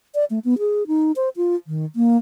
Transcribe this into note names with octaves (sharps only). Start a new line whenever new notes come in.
D5
A3
B3
G#4
D#4
C5
F4
D#3
A#3